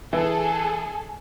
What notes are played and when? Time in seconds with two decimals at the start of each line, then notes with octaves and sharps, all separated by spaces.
0.13 E3 G#4 A4